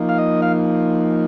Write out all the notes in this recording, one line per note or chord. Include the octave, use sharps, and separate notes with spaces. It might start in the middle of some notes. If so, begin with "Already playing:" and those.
Already playing: F3 A#3 D#4
F5
D#5
F5